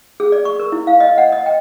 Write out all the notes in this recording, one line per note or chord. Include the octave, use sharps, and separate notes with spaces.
G#4
D5
C#6
A#4
E4
F5
D#5
F#5
D#5
G5